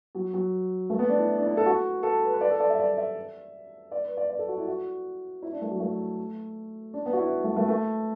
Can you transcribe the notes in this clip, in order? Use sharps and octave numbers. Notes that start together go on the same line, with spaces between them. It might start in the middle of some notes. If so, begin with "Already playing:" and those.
F#3
F#3
A3
B3
D4
E4
D4
E4
A4
F#4
A4
B4
B4
D5
A4
D5
E5
D5
E5
D5
B4
D5
D5
A4
F#4
E4
F#4
E4
D4
A3
F#3
A3
D4
B3
F#4
E4
A3
A3
A3